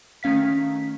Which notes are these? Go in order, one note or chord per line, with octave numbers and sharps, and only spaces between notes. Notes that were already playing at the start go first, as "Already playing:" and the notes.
D#3 A3 C#4 F5 B6